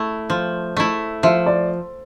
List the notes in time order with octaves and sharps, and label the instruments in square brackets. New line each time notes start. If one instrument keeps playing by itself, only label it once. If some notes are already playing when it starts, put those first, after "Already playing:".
Already playing: [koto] A3 E4
F3
A3 E4
[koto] F3 [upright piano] E5
[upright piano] D5